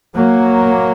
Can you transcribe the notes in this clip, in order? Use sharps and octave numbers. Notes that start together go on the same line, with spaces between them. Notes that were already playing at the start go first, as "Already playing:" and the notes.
F#3 A#3